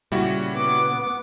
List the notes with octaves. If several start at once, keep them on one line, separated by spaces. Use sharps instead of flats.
A#2 C#3 G3 E4 F#4
B3 D6